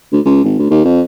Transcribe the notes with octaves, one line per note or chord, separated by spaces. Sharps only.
D2
C#2
G#1
D2
D#2
F2